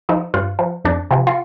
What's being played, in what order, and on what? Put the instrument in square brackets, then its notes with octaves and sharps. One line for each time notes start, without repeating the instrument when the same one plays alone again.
[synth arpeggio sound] F3 D#4
G2 F4
F3
F2 D4
C3 F3
F4